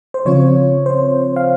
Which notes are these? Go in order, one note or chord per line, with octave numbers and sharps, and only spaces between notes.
C5
C#3 F3 C4 F4 C#5
C5
F5